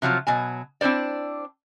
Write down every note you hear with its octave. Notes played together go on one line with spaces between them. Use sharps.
C3 F3 F#3 F4
B2 F#3 G#5
C4 D4 E4 C5 D5